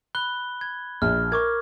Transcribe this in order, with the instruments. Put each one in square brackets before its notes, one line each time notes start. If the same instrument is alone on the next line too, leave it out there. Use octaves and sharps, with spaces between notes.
[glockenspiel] B5 F#6 G7
G#6
[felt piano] A#1 [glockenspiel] F6
[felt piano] A#4 [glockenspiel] C#6 D6 G#6